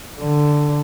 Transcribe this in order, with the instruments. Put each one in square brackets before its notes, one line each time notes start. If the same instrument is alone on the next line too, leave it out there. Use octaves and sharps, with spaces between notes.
[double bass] D3